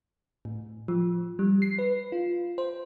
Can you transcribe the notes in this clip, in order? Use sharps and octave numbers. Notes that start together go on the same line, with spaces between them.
A2
F3
G3
C7
B4
F4
C5